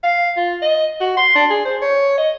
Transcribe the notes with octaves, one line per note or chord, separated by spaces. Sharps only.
F5
F4
D#5
F#4
C6
D4
G#4
C5
C#5
D#5